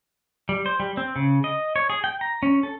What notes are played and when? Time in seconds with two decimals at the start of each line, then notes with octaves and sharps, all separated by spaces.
0.49 G3
0.66 C5
0.80 G3
0.97 C4
1.16 C#3
1.44 D#5
1.76 C#5
1.90 G#4
2.04 G5
2.21 A#5
2.43 C#4
2.63 A4